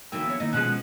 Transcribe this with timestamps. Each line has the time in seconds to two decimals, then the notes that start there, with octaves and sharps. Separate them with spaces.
0.12 D3 E3 F#3 A#3 D#4 E4 G5
0.28 B3 C#5
0.40 D#3 A#3 D#4 E4
0.53 B2 F3 G#3 C#4 B4 F#5